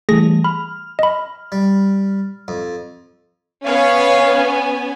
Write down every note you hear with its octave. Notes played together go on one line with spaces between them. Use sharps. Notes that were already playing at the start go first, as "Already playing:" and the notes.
E3 G3 A3 G#4 A#6
B5 F6
D#5 B5
G3
F2
B3 C#4 C#5 F5 G#5